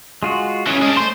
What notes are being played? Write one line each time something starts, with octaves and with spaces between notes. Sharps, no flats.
G#3 F4 F#4
C#3 E3 C#4
G#3 D4
A3 C5 C6